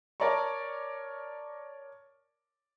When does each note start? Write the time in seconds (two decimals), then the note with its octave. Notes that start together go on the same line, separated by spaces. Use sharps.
0.20 A#4 C#5 D5 A5 A#5 C#6